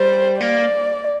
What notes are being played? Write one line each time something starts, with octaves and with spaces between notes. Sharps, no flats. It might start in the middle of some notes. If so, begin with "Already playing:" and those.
Already playing: G3 C5
A#3 D5